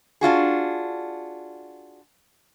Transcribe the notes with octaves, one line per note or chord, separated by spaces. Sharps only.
D4 F4 F#4 G#4